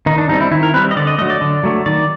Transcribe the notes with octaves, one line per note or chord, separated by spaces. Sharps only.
D#3 D#4
D4
G3 C4 D#4
E4
D#3 E4
A#4
G3 C4 B4
D#5
D3 D5
D#5
F#3 A3 D#5
D5
D3
F#3 A3
D#3 D5